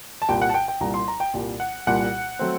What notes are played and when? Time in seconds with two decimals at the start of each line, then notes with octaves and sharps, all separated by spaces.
0.22 A5
0.28 C2 A#2 G3 G5
0.42 F#5
0.49 A5
0.54 G5
0.68 G5
0.80 C2 A#2 G3 A#5
0.94 C6
1.08 A#5
1.20 G5
1.34 C2 A#2 G3
1.60 F#5
1.87 C2 A#2 G3 F#5
2.39 F#3 A3 C4